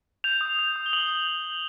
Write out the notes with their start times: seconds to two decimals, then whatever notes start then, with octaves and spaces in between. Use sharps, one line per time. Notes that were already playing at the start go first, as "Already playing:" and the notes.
0.24 G6 F7
0.41 D#6
0.59 G6
0.76 D#6
0.86 G7
0.93 D#6 F#7
1.10 D#6
1.27 G6
1.45 G6